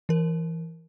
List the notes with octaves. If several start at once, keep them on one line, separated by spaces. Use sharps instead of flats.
E3 A#4